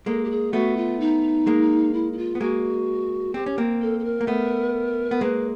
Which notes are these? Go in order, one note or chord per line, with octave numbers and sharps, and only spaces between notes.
G#3 A#3 A4
G4
G#4
A3 B3 F#4
F4
D#4
G#3 A#3
E4
E4
F4
B3
G#3 A#3 F#4
C4 G4
C#4
A#3 C4
A4
A4
A#4
A#3
A3 B3
B3
G#3 A#3 B4